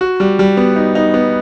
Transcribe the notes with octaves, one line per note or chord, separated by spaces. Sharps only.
F#4
G3
G3
B3
D#4
D#4
B3